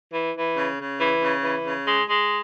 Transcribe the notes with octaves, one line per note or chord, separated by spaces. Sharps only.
E3
E3
C#3
C#3
E3
C#3
E3
C#3
G#3
G#3